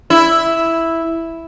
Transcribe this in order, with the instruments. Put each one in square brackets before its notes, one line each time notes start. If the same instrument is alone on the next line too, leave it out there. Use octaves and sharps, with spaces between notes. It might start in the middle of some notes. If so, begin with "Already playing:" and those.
[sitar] E4